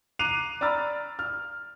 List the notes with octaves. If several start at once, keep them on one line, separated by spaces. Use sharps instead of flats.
A#5 D6 F#6 C7 D#7 F7
D5 A#5 B5 E6 F6 A6
F6